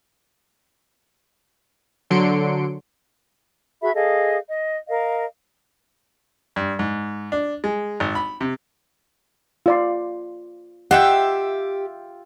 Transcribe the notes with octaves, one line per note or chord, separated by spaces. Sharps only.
D3 F#3 C6 C#7 D7
F#4 G#4 E5 B5
G#4 A4 D#5 F5
D#5
A#4 D#5 F5
G2
G#2
D4
G#3
G#1
B5
C3
F4 D5 C6
F4 G4 D#5 E5 F#5 G5